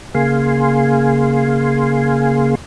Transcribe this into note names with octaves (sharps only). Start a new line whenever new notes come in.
C#3 A#3 G#4 F5 G#5 C6